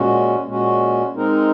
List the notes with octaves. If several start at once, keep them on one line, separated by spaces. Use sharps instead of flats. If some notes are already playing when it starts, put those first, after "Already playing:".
Already playing: A#2 G#3 C#4 F#4
A#2 G#3 C#4 F#4
G#3 C4 D#4 A#4